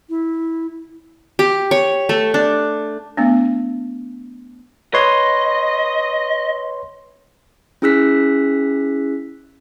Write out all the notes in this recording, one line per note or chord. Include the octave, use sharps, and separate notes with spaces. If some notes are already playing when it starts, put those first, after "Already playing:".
E4
G4
C#5
A3
D4
A3 B3 D4
B4 C#5 D#5 C6
C#4 E4 G#4 E6 F#6 B6